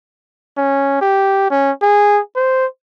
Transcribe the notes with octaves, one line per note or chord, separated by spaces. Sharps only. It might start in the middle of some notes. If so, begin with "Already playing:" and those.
C#4
G4
C#4
G#4
C5